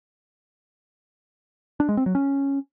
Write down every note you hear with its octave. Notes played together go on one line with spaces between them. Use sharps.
D4
G#3
C4
F#3
C#4